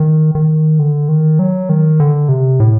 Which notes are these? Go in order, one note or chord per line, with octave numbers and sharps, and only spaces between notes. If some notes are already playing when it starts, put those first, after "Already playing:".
Already playing: D#3
D#3
D3
D#3
F#3
D#3
D3
C3
A2